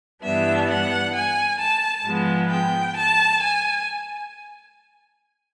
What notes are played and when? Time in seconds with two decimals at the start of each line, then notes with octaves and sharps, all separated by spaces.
0.23 G2 E3 G3 B3 D4 E5
0.69 F#5
1.15 G#5
1.60 A5
2.05 G#2 F3 G#3 B3
2.51 G5
2.96 A5
3.41 G#5